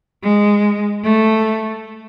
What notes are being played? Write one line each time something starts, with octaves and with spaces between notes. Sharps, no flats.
G#3
A3